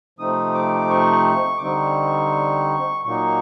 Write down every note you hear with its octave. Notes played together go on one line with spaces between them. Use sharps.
C3 F3 A3 C4 D#4 D#6
D6
C#6
D6
D3 G3 C4 D#4 C#6
A#2 F#3 A#3 D#4 C#6